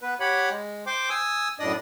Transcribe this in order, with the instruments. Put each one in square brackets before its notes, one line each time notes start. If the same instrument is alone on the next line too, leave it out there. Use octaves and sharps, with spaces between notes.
[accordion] B3 B4
G4 C#5 F#5 B5
G#3
C5 G5 C6 D6
G#5 D#6 E6
F#2 A2 D4 D5 D#5 D#6